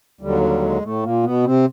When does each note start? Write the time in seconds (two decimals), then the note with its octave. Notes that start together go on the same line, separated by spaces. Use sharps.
0.21 D#2 D3 F#3 G3
0.42 G3
0.62 G#3
0.82 A2 A3
1.03 A#2 A#3
1.23 B2 B3
1.44 C3 C4